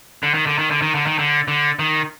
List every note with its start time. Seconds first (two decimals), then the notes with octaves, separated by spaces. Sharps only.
0.23 D3
0.34 D#3
0.47 D3
0.58 D#3
0.71 D3
0.82 D#3
0.95 D3
1.06 D#3
1.19 D3
1.48 D3
1.79 D#3